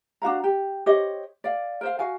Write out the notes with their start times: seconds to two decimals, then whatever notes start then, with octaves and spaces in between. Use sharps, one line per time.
0.22 D4 F#4 F5 A#5
0.44 G4
0.86 G4 C5 C#5 D#5
1.44 D5 F5
1.81 A#4 C5 F5
1.99 F#4 F5 G#5